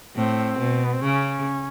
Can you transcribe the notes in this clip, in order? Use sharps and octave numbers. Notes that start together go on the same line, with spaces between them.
A2 C4
B2
B3
C4
C#3 C#4